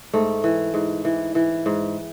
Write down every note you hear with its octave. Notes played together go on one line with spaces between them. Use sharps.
G#2 A3
E3
G#2
E3
E3
G#2